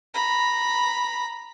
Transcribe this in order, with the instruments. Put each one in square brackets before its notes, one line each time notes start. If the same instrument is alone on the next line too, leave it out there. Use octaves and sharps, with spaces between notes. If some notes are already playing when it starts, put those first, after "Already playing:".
[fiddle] A#5 B5